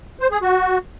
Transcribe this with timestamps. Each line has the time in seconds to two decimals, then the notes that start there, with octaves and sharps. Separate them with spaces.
0.20 C5
0.31 G#4
0.42 F#4